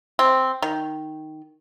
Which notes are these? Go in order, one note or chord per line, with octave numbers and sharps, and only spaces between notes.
C4
D#3